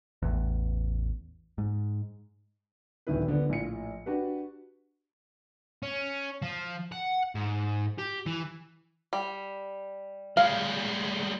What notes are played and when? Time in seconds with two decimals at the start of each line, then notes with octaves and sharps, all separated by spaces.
0.22 A1 E2
1.58 G#2
3.07 D1 A#1 D3 D#3 E4 B4
3.28 D3 F3 B3
3.49 A#1 A2 F4 C#7
4.06 D4 F#4 G4 B4
5.83 C#4
6.42 F3
6.92 F#5
7.35 G#2
7.98 G4
8.26 E3
9.13 G3
10.37 G3 G#3 F5